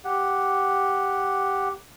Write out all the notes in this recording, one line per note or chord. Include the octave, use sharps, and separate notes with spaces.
G4 F#5